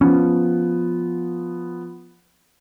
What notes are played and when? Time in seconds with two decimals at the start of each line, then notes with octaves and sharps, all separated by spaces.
0.01 F3 B3 C#4